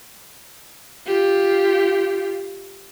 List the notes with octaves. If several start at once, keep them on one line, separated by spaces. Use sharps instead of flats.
F4 G4